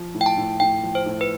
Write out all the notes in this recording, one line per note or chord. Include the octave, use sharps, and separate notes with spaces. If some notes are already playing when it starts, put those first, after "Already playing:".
Already playing: F3
A2
G5
A5
A2
A2 G5
F3
C5
A2
B4